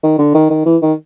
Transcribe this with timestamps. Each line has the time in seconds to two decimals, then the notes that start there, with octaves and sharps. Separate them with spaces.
0.03 D#3
0.18 D3
0.34 D#3
0.50 D#3
0.66 E3
0.82 D#3